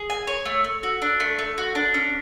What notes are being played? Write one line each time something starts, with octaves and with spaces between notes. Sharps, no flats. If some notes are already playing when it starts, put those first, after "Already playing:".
Already playing: G#4
G#5
C#5
A3
A3
F#4
D4
A3
A3
F#4
D4
C#4